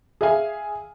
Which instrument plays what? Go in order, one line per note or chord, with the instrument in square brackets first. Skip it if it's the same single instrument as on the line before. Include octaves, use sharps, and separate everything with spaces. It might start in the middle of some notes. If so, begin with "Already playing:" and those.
[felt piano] G#4 E5 F5 G#5